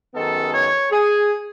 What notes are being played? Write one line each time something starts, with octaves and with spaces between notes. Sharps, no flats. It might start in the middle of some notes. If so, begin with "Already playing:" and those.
F#2 D#3 G#3 B3 A4
C#5
G#4